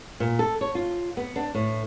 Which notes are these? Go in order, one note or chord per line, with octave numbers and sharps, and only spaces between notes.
A#2
A4
C#5
F4
B3
D4
A2